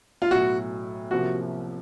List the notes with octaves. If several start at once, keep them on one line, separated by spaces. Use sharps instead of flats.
F4
B1 A2 F#3 F#4
C2 C3 F3 A#3 F#4